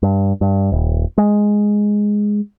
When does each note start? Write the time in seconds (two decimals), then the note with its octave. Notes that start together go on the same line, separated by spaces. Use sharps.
0.03 G2
0.41 G2
0.72 D#1
1.18 G#3